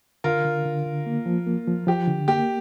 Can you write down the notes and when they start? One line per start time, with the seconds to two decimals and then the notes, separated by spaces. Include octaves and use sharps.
0.24 D3 F4 A#4
0.45 D3
0.65 D3
0.86 D3
1.06 A#3
1.26 F3
1.46 A#3
1.68 F3
1.87 F3 G4
2.08 D3
2.28 A#3 G4